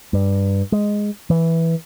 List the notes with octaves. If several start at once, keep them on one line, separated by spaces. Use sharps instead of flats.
G2
G#3
E3